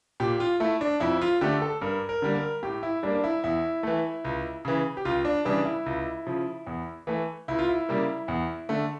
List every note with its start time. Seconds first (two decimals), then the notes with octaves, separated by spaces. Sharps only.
0.20 A#2 G4
0.40 F4
0.60 A3 E4
0.81 D4
1.00 F2 E4
1.21 F4
1.41 D3 A3 G4
1.62 A4
1.82 G2 A#4
2.09 A#4
2.22 D3 G3 A#3
2.35 A#4
2.63 A2 G4
2.83 E4
3.03 G3 D4
3.06 A#3
3.15 D4
3.24 E4
3.44 E2 E4
3.83 E3 A3
4.25 C#2
4.65 C#3 E3
4.97 G4
5.05 C#2 F4
5.25 D4
5.45 C#3 E3 G3 D4
5.65 E4
5.86 C#2
6.26 C#3 F3
6.67 E2
7.07 E3 A3
7.48 C#2 E4
7.59 F4
7.69 E4
7.89 C#3 G3 A#3
8.28 E2
8.69 D3 A3